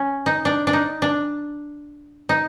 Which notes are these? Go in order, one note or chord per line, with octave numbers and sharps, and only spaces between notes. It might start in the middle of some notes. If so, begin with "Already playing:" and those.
Already playing: C#4
D#4
D4
D4
D#4
D4
D#4